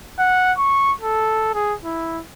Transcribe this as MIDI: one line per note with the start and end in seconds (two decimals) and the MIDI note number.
0.19 0.53 78
0.58 0.93 85
1.01 1.50 69
1.55 1.75 68
1.85 2.21 64